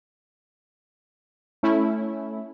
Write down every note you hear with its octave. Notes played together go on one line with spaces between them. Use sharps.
A3 C#4 E4